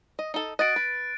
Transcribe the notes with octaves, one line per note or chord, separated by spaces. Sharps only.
D#5
D#4 A4
F#4 D#5 F#6 A6 D7
B4